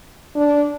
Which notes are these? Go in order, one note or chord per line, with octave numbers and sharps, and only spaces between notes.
D4